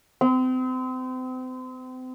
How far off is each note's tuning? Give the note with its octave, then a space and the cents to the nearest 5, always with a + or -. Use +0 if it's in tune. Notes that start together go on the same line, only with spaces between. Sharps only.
C4 -35